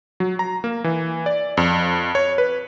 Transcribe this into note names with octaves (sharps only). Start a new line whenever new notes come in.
F#3
A#5
A#3
E3
D5
F2
C#5
B4